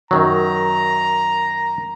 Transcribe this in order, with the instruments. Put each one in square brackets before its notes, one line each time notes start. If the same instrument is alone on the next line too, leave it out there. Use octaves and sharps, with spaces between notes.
[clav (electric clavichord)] F#2 D#3 F#3 [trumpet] A#5